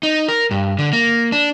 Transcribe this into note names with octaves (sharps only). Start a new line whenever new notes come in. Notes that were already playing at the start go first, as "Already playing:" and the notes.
D#4
A#4
G2
D3
A#3
D4